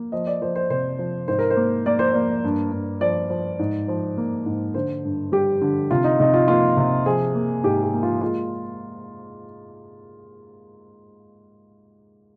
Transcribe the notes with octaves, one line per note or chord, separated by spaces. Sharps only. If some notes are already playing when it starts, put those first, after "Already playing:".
Already playing: A#3
F3 D#5
D5
F3 C5
C5
C3 C5
F3
G#2 C5
A#4
C5
A#3
A#3 D5
C5
A#3 D5
G2
G2
F3 D5
F3
G#2
F3
A#3
G#2
D3 C5
G2
G3 G4
D3
C3 F4
D#4
C3 D#4
F4
A#3 F4
C3
F3 G#4
A#3
G#2 G4
G4
A#3
F4
G#3 F4